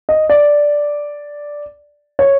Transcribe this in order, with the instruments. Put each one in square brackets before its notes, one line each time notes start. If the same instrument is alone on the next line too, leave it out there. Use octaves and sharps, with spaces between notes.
[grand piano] D#5
D5
C#5